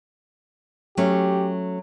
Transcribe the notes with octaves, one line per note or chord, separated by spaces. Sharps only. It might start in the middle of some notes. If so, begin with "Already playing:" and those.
F#3 A3 C#4 G4